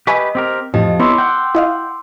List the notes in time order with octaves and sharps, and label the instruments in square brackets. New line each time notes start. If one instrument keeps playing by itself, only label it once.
[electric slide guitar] G4 B4 [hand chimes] D#5 [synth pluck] E5 G#5 C#6
[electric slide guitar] C4 G4 A#4
[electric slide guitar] F2 [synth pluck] A2 E3 [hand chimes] G4 D#5 A5
[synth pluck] B3 [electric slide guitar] E4 C#5 [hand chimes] C6 D6 E6
[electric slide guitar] F#5 G5
[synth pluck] E4 D#5 F5